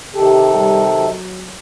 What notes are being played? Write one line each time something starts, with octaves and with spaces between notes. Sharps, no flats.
C3 D#3 G4 A4
G3
F#3